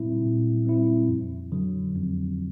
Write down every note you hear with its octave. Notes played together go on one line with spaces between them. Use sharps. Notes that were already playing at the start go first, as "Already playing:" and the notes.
Already playing: A#2 G3 C4 E4
A#2
G3 C4 E4
F2
D3 F#3
F2